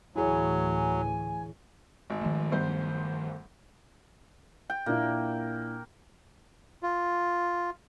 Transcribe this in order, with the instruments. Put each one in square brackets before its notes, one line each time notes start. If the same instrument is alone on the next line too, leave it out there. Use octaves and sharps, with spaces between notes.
[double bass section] D2 A2 E3 [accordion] F#3 [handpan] E4 G#4 C#5 [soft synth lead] G#5
[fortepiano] G#1
[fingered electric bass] D#3 F3 A3
[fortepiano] B1 G2 C5
[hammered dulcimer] G5
[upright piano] A#2 D4 E4 [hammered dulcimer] A#3
[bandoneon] F4